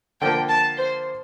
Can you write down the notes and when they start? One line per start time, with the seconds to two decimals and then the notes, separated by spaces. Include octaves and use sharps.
0.21 D3 F3 A#3 G5
0.49 A5
0.77 C5